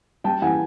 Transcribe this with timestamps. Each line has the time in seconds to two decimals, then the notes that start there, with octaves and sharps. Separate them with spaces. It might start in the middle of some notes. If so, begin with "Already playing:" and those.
0.24 G3 G5 A5
0.42 E3 F#5 G#5